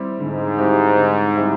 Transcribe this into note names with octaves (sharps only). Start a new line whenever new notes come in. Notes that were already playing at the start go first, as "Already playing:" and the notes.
Already playing: G3 C4 E4 G4
G#2 D3
G3 C4 E4 G4
D3
G3 C4 E4 G4